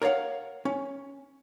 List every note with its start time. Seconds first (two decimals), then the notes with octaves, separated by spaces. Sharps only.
0.02 A#4 C#5 D5 F5 F#5
0.65 C#4